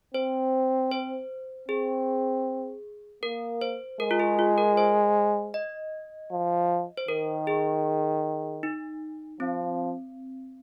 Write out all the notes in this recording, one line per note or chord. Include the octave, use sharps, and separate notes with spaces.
C4 C5
C5
C4 G#4
A#3 A#4
C5
G#3 A#4
F4
G#4
F4
A#4
C5
D#5
F3
C5
D#3 A#4
G#4
D#4
F3 C4